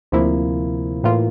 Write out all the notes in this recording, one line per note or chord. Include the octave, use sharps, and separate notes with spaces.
D2 C3 F3 A#3 E4
A2 E3 A#3 F4